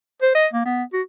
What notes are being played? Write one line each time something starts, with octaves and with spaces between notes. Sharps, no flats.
C5
D#5
A#3
B3
F#4